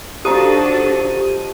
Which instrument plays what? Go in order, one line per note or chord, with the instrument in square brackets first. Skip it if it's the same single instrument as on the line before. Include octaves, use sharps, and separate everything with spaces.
[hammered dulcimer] F3 D#4 [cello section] D4 F#4 A4 [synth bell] G4 D#6 D#7